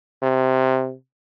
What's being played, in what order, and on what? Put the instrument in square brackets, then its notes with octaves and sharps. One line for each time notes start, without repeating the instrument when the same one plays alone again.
[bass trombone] C3